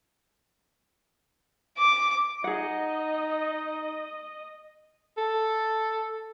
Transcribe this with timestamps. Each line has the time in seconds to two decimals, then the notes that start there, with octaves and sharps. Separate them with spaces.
1.77 D6
2.44 D#4 G#4 D#5 F#5
5.17 A4